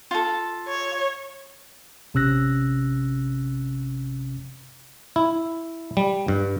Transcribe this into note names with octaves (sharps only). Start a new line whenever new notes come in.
F4 A4
C#5
A1 C3 C#4 E6 F#6 A#6
E4
G3
G2